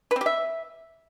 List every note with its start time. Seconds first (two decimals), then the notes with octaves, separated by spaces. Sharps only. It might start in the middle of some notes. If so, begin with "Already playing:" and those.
0.11 B4
0.16 C4
0.21 G4
0.26 E5